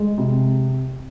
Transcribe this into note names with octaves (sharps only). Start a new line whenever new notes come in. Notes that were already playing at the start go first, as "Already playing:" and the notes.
Already playing: G#3
C3